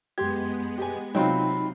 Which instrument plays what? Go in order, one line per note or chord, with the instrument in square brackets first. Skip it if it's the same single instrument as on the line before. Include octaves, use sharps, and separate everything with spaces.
[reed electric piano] F#2 C6 G#6 [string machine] G#3 B3 [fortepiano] G4
[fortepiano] G4 G#5
[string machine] C3 [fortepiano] F#3 C4 F4 [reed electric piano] D#4 G5 [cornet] B5